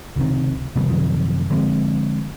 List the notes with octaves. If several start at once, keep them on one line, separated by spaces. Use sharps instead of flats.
C#2 C3 D#3
C3 D#3 G3 B3
F#2 C3 D#3 F3
D3 F3 G#3 C4